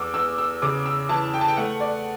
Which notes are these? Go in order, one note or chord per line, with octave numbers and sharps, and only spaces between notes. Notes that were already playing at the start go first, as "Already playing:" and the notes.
Already playing: E2 D6 E6
E2 E6
E6
C#3 D6
E6
E3 A5
G5
A5
G5
A3 F#5
D5